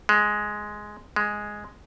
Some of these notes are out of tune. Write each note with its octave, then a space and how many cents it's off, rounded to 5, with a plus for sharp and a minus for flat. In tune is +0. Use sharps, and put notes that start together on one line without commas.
G#3 +5
G#3 +0